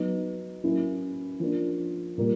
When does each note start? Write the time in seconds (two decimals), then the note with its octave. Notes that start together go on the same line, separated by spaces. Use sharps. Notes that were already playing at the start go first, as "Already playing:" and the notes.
Already playing: F#3 B3 D#4
0.64 F#3 A#3 C#4 E4
1.40 F3 A#3 D4
2.18 A#2 G3 A#3